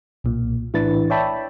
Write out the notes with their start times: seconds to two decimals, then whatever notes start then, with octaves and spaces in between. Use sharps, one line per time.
0.24 B1 A#2
0.74 A2 E3 D4 E4 B4 A6
1.10 C#5 D5 E5 G5 A5 B5